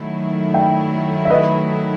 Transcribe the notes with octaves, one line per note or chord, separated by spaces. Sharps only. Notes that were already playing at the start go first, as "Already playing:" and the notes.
Already playing: D#3 F#3 A3 E4
E5 G5
E5
B4 D#5